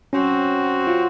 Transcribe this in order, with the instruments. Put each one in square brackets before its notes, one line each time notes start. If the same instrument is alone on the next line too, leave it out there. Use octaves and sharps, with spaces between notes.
[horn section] F#3 C4 F#4 [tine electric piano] C#4
[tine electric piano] F4